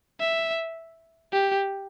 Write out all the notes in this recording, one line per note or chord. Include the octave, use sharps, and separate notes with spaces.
E5
G4